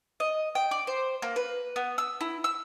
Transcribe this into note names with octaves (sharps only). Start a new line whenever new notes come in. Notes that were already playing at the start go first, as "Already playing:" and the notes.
D#5
G5
D5
C5
A#3
B4
B3
E6
E4
E6